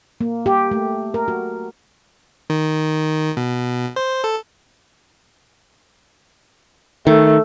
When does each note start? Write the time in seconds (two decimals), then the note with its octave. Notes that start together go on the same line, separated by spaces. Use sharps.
0.21 A#3
0.46 G4
0.71 A3
1.14 A#4
1.28 F#4
2.50 D#3
3.37 B2
3.96 C5
4.24 A4
7.07 D#3 A3